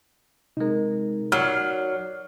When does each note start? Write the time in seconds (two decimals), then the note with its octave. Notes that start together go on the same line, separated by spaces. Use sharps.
0.57 C3 G#3 D#4 A#4
1.32 F#3 D5 F6 C7